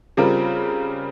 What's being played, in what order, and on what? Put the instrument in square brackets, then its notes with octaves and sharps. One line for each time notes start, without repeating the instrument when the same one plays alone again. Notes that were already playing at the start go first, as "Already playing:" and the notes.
[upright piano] C#3 G3 C4 F4 A#4